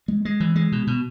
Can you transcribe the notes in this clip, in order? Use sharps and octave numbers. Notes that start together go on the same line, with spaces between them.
G#3
G#3
E3
G#3
B2
B2